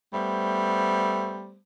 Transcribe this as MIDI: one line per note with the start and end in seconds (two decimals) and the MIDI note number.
0.14 1.57 55
0.14 1.57 57
0.14 1.57 59
0.14 1.57 72